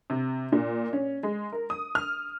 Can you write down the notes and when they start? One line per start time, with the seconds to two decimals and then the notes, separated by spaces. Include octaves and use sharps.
0.10 C3
0.52 A#2
0.93 C#4
1.23 G#3
1.53 A#4
1.70 D#6
1.95 F6